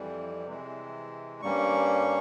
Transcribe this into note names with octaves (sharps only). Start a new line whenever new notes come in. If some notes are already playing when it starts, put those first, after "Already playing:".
Already playing: F2 E3 G3
C3 E3 G#3
G2 G3 A#3 C#4 C#6